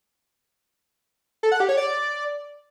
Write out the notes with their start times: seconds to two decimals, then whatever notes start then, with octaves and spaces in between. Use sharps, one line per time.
1.43 A4
1.52 F#5
1.60 G4
1.69 C#5
1.77 D5